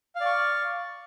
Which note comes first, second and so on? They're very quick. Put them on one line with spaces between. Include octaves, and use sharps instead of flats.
F5 D5 C#6